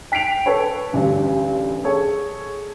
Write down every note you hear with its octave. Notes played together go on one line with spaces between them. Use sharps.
G5 B6 C7 D7 F7
A4 B4 C#5
A1 D2 G2
G#4 A4 C#5